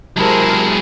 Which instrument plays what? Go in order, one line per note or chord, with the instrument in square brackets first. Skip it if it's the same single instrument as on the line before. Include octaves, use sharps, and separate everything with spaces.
[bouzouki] C3 A5 [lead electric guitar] F#3 G#3 [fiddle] E4 G#4 [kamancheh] A#4 C5